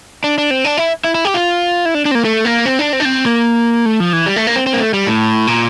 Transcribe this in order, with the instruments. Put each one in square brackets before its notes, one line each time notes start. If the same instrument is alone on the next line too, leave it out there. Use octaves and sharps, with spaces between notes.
[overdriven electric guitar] D4
D4
C4
D4
E4
E4
E4
G4
F4
E4
D4
D4
C4
A#3
A3
A#3
C4
D4
C4
D4
C4
A#3
A3
F3
E3
G3
A3
A#3
C4
C4
A#3
A3
G3
A2
A#2